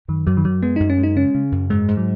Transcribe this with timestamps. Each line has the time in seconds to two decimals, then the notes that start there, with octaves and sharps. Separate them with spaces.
0.08 F#2 D#3
0.26 F#2 F#3
0.37 D#3
0.44 F#2 F#3
0.63 G#3 B3
0.76 F#2 D#4
0.90 C#4
0.98 G#3
1.03 D#4
1.16 C#3 C#4
1.35 C#3
1.52 F#2
1.70 G#2 G#3
1.88 G#2
1.97 F#3